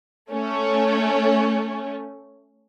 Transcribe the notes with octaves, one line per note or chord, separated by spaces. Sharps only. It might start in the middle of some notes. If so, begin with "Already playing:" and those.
A3 C#4